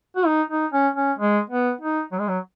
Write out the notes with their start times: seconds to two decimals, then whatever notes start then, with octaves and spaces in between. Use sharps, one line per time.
0.16 F#4
0.26 D#4
0.50 D#4
0.72 C#4
0.96 C#4
1.19 G#3
1.50 B3
1.81 D#4
2.12 F#3
2.20 G#3
2.28 F#3